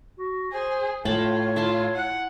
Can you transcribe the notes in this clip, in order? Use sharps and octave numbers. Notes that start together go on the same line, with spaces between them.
F#4
G#4 C5
A2 F4 C#5 G5 A5 B5
E4 F4 A5 C6
F#5